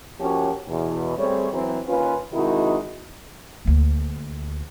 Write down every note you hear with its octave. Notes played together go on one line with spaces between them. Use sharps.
F3 A#3 C#4 F#4 G4 C#5
E2 B2
G3 A3 C4 G#4 C#5
E3 F#3 C4 C5
D#2 C#4 F4 B4
C3 D#3 G#3 D#4 E4 F#4
D2 A#3